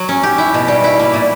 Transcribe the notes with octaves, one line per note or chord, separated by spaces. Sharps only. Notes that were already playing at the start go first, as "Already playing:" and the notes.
Already playing: F#3
C#4
G4
E4
B2
G3
E4
A#3
A#2